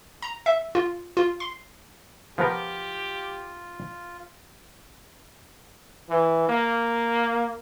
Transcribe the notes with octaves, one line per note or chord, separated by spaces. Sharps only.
A#5
E5
F4
F4
C6
F3 B3 F4 G4 A#4
E3
A#3